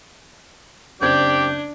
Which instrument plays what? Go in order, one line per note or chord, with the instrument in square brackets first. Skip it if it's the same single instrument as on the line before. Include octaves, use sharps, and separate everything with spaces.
[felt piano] F#1 C4 G#6 [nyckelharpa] D4 [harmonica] G4 D5 [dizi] G6